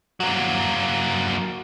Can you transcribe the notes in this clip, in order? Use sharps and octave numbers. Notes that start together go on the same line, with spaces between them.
F#3 A#3